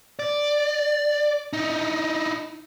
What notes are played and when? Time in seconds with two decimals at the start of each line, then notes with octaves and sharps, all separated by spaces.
0.19 D5
1.53 D#4 E4